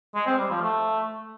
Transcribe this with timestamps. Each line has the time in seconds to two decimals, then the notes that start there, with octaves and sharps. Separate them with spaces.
0.15 G#3
0.26 C4
0.38 G3
0.50 F3
0.62 A3